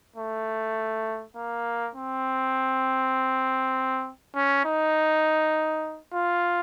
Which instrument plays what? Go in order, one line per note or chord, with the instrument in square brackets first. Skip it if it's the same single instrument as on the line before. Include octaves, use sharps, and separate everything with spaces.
[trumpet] A3
A#3
C4
C#4
D#4
F4